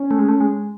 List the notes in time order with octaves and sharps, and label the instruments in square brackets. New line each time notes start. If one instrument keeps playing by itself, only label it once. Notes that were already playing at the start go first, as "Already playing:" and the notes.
Already playing: [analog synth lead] C#4
[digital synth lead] A3
G#3
A3
G#3